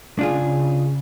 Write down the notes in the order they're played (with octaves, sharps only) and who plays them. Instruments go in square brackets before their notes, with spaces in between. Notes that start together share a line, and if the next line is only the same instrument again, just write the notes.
[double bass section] C#3 [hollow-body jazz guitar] D4 F4 G#4